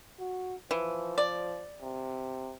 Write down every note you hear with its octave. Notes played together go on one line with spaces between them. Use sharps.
F#4
E3 F3
D5
C3